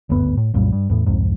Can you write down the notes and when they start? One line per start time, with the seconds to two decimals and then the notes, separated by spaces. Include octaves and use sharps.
0.09 F#1 D2 G2 B3
0.37 A2
0.54 C2 F#2 A#2 G3
0.72 G2
0.90 E2 A2
1.06 C2 F2 G#2